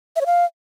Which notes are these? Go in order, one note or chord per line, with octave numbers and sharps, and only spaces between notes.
E5
C#5
F5